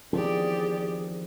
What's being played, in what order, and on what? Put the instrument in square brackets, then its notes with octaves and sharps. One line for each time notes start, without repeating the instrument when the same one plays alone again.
[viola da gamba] E2 G4 D5 [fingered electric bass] D#3 F3 C4 [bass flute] G#4